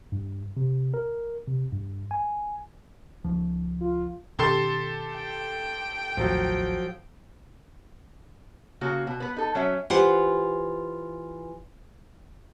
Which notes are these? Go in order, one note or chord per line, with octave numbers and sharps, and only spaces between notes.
G2
C3
A#4
C3
G2
G#5
C#2 F3
F4
B2 D#3 C#4 G4 A4 C6
G5
A1 D#2 A2 F3 F#3
C#3 A#3 F#4
B2
B3 B4
D#4 A4
F#3 C#4 E5
E3 F4 G4 C5 F#5